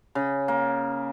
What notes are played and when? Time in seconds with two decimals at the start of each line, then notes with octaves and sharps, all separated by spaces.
0.15 C#3
0.48 A#3